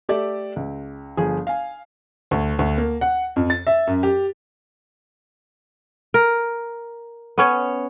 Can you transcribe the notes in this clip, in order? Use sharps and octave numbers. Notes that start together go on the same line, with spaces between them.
A3 G4 A4 D5 E5
C#2
G1 F3 G#4
F5 G#5
D2
D2
A#3
F#5
F2
A6
E5
F#2
G4
A#4
B3 C#4 C#5